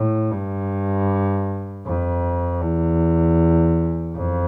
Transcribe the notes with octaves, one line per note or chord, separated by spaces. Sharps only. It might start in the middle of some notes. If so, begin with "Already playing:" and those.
Already playing: A2
G2
F2
E2
F2